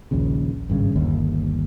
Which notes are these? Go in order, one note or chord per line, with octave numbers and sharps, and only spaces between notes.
A#1 D#2 A#2 C#3
G#1 G2 C#3
G1 D#2